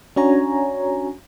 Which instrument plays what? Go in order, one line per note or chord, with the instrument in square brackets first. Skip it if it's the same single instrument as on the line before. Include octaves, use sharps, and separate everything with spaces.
[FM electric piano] C#4 D4 F#4 C#5 G#5 A#5